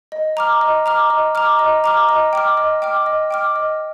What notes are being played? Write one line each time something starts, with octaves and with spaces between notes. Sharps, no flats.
D#5
A#5 D6 F6
D#5
A#5 D6 F6
D#5
A#5 D6 F6
D#5
A#5 D6 F6
D#5
G5 D6 F6
D#5
G5 D6 F6
D#5
G5 D6 F6
D#5